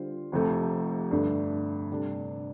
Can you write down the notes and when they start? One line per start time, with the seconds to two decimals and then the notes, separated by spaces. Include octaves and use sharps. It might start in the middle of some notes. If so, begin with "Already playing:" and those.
Already playing: D3 G3 F4 C5
0.32 F1 F2 C3 A3
1.11 G2 D3 A3
1.90 C3 G3 D4 A4